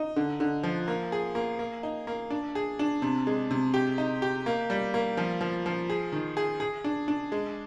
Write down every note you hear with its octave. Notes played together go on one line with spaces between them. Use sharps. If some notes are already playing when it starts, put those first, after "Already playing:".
Already playing: D#4
D3
D3
F3
A#3
G#4
A#3
A#3
D#4
A#3
D4
G#4
D4
C3
G#3
C3
G4
D#4
G4
A#3
G3
A#3
F3
F3
F3
G#4
D#3
G#4
G#4
D4
D4
G#3